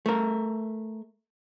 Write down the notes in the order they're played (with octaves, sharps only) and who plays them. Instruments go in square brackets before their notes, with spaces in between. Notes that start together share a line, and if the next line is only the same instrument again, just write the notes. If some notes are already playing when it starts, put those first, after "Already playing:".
[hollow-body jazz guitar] A3 A#4